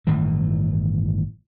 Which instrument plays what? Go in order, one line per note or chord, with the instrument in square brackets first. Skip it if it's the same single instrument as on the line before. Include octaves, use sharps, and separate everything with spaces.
[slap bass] G1 A2 D#3 E3